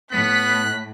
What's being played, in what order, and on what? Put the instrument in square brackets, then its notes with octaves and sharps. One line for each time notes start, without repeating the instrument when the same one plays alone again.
[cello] A2 [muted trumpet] B3 [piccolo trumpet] F#6 [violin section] B6